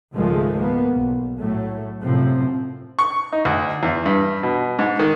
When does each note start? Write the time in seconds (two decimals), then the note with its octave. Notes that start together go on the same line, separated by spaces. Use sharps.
0.14 C#2 G#2 D#3 F3 G#3 A3
0.59 A#3 B3
0.93 B1
1.39 A2 F#3 A3
2.02 F#2 A2 C3 F3 C4
2.99 C#6
3.32 D#4
3.45 D2
3.83 E2
4.06 G2
4.43 B2
4.79 G#2
4.99 D#3